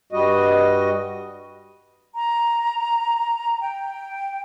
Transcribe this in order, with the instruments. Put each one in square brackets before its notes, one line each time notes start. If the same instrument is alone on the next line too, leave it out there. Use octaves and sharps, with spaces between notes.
[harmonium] G2 G3 F#4 D#5
[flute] A#5
G5